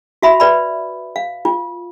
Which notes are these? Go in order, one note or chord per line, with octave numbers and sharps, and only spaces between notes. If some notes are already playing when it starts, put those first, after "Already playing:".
F#4 E5 B5
B4 D5 B5
F5
F4